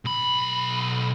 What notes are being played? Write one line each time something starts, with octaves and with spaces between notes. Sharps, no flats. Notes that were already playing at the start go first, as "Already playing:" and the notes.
B1 B5